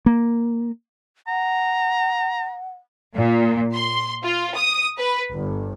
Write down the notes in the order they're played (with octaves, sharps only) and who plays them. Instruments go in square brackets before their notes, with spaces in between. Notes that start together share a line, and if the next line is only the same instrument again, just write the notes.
[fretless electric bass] A#3
[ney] F#5 [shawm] A#5
[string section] A#2
C6
F4
D#6
B4
G1